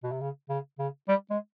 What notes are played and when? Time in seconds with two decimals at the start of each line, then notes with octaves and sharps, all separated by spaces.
0.03 B2
0.11 C3
0.21 C#3
0.49 C#3
0.79 C#3
1.08 G3
1.30 G#3